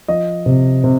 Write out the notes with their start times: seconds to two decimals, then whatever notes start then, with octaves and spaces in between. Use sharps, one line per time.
0.08 F3 D#5
0.46 C3
0.84 C3